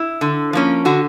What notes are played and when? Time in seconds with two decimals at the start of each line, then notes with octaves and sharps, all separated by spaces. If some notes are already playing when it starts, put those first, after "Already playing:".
Already playing: E4
0.21 D3
0.53 F3 A#3 C#4
0.85 D3 F#4